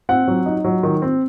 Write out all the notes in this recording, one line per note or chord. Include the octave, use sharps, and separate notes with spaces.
C4 F#5
F#3
D#4
F#3
D#3
C4